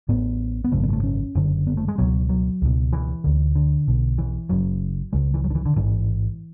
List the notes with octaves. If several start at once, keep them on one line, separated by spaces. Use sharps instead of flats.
A1 A2 B3
B3
G#1 F#2 C#3 A3
B3
G#3
A3
C#4
F#1 F#2 D3
B3
A3
G#3
C#2 B2 F#3
F#3
C#2 B2
E3
D2 D3
D3
B1 B2
E3
F#1 F#2 C#3 F#3
C#2 C#3 G#3
E3
F#3
D3
E3
D3
A1 G#2 E3